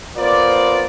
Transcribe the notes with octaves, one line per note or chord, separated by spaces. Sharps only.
B3 F4 A#4 C5 D5